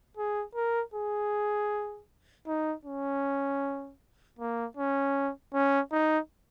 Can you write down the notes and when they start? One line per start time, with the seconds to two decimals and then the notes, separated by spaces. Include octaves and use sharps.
0.17 G#4
0.55 A#4
0.94 G#4
2.47 D#4
2.85 C#4
4.39 A#3
4.77 C#4
5.54 C#4
5.92 D#4